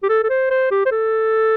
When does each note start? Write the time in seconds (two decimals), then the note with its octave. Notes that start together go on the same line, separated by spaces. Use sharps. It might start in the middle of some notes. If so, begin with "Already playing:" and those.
0.03 G4
0.09 A4
0.24 A4
0.30 C5
0.50 C5
0.71 G4
0.86 C5
0.91 A4